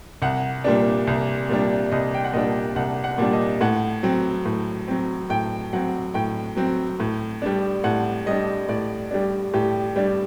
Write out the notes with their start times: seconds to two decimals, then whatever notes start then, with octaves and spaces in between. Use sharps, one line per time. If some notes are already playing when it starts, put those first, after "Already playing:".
0.22 C2 F#5
0.64 A#2 G3 D4
1.07 C2
1.49 A#2 G3 D4
1.92 C2 D#5
2.14 G5
2.24 F#5
2.34 A#2 G3 D4 D#5
2.76 C2 F#5
3.04 F#5
3.18 A#2 G3 D4
3.33 D#5
3.61 A2 F#5
4.03 F#3 C4
4.46 A2
4.88 F#3 C4
5.30 A2 G5
5.73 F#3 C4 F#5
6.14 A2 G5
6.56 F#3 C4
7.00 A2
7.42 G3 D4
7.84 A2 F#5
8.26 G3 D4 D#5
8.69 A2 D5
9.11 G3 D4
9.54 A2 G4
9.96 G3 D4